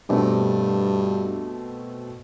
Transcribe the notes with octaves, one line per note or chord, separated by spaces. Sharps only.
G2 B2 A3 C4